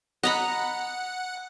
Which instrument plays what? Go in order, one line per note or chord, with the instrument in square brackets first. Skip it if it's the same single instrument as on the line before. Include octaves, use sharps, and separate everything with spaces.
[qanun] D#5 A#5 B5 [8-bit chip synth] F#5